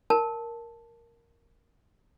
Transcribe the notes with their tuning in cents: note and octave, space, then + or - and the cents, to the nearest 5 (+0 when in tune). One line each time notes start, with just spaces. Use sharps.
A#4 +0 A5 +0